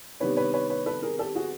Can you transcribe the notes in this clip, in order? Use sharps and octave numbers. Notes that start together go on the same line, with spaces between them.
C3 D#3 G3 B3 D4 B4 C#5
B4 C#5
B4 C#5
B4 C#5
A4 B4
G#4 A#4
G4 A4
F#4 G#4